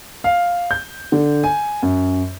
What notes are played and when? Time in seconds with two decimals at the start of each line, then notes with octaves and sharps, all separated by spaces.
0.24 F5
0.71 G6
1.12 D3
1.44 G#5
1.83 F#2